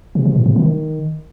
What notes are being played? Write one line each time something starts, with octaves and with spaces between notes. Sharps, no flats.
C3
C3
A2
C3
D#3